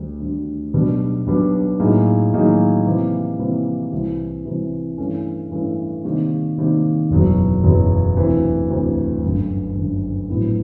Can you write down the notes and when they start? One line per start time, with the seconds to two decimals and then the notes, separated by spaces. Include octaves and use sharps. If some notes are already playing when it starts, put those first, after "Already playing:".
Already playing: D2 D3 G3
0.20 D2 D3 G3
0.74 B1 B2 G3 B3 D4
1.26 B1 B2 G3 B3 D4
1.80 A2 F#3 A#3 D#4 G#4
2.32 A2 F#3 A#3 D#4 G#4
2.86 C3 E3 G3 A#3
3.39 C3 E3 G3 A#3
3.92 C2 C3 E3
4.45 C2 C3 E3
4.98 G2 E3 A3 C#4
5.51 G2 E3 A3 C#4
6.04 C3 D#3 G3 A#3
6.57 C3 D#3 G3 A#3
7.10 F#1 E2 B2 F#3
7.63 F#1 E2 B2 F#3
8.17 D2 C3 E3
8.70 D2 C3 E3
9.23 G1 F#2 D3
9.76 G1 F#2 D3
10.29 A#1 A2 F#3 B3 E4